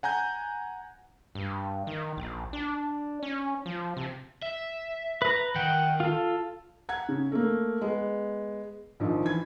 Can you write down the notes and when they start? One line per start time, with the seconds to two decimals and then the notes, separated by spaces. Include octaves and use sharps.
0.03 F#5 G#5 A#5 G6
1.35 G2
1.87 D#3
2.17 A#1
2.53 D4
3.23 C#4
3.66 F3
3.97 C3
4.42 E5
5.22 B4 A#5
5.56 D#3 F#5 G5
6.00 F4 A4
6.89 F#5 A#5 G#6
7.09 C#3
7.32 A3 A#3
7.81 G#3 B3
9.00 A#1 D#3 F3
9.25 E3 G#6